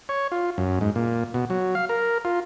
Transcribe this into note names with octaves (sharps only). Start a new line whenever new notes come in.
C#5
F4
F#2
G#2
A#2
B2
F#3
F5
A#4
F4